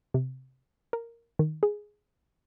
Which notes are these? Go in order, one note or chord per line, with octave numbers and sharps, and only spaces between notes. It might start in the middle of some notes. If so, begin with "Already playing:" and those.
C3
A#4
D#3
G#4